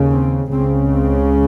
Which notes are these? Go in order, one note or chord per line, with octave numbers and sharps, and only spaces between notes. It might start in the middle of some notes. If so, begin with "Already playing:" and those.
Already playing: D#2 C#3
C4
C#2 C#3 C4
C4